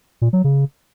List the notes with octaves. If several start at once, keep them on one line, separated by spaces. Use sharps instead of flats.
A#2
F#3
C#3